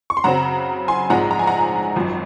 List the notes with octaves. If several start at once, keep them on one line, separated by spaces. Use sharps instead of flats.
C#6
C6
F#2 C#3 F#3 C4 F#5 A#5
G#5 C6
A#1 G#2 F3 G#3 C4 F#5 A#5
A#5
G#5
F#5 A#5
G#1 F#2 F3